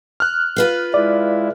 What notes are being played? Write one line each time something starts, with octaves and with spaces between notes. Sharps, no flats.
F6 F#6
F4 B4 F5
G#3 E4 D5